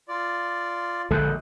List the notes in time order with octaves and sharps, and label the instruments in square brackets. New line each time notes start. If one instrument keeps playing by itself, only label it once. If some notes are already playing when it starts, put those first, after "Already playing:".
[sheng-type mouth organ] F4 D5
[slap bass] A#1 D3 G#3 [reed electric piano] A4 F#6 G6